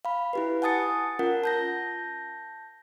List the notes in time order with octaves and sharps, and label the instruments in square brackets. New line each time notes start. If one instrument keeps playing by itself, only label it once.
[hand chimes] F5 B5
E4 G4 B4
F#5 G#5 A5 D#6 A6 C#7
C#4 F4 A#4 F#5
A5 G6 A#6